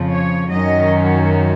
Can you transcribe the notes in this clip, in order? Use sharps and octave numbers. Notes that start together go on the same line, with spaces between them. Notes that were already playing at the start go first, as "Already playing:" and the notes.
Already playing: F2 C#3 F3
C#5
F#2 D#3 F#3 C#4 D#5